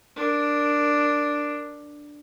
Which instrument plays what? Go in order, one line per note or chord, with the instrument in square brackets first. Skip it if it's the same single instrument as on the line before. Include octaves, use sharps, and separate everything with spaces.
[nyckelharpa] D4 A#4